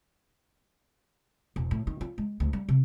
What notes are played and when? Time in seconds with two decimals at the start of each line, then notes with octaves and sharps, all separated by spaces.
1.56 E1
1.71 A2
1.87 D#3
2.01 F4
2.18 G#3
2.40 D2
2.53 G3
2.69 C3